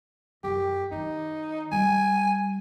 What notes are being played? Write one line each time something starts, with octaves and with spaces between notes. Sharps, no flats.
F#2 G4
D#3 D#4
G3 G#5